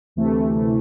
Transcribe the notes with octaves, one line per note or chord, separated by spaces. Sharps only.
D2 C3 E3 A3